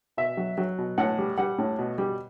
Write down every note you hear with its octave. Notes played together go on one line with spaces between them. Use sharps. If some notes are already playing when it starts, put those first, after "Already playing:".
B2 E5
F#3
F#3
B2
A2 F#5
G3
G3 F#5
A2
B2
G3